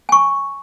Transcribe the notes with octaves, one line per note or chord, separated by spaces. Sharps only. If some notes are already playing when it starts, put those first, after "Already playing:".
G#5 C#6